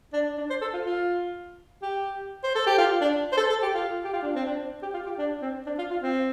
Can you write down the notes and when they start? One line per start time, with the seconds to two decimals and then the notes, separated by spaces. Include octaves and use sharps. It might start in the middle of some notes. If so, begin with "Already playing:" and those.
0.13 D4
0.37 D4
0.50 C5
0.62 A4
0.73 F4
0.85 F4
1.82 G4
2.44 C5
2.55 A4
2.66 G4
2.78 F4
3.01 D4
3.32 C5
3.37 A4
3.49 A4
3.62 G4
3.74 F4
4.05 G4
4.13 F4
4.22 D4
4.35 C4
4.46 D4
4.82 G4
4.94 F4
5.06 G4
5.18 D4
5.42 C4
5.66 D4
5.78 F4
5.91 F4
6.02 C4